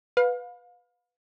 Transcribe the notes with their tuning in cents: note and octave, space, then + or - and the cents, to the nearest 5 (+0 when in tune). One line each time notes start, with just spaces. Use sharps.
B4 +0 F5 +30